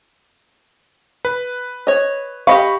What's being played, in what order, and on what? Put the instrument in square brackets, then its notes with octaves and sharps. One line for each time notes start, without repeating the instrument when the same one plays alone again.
[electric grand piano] B4
[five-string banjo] C#5 D#5
[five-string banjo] G4 D#5 F5 [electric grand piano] B5 C#6